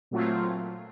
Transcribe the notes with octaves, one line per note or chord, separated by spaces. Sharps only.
A#2 F#3 A3 C4 F4